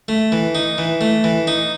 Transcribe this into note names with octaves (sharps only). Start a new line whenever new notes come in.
A3
E3
D#4
E3
A3
E3
D#4